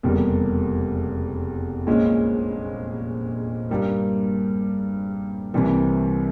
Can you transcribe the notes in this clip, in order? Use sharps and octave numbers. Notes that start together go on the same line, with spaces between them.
F1 E2 C#3 G3 A#3
A#1 A#2 G#3 C#4
G2 G3 A#3
C2 C3 E3 G3 A#3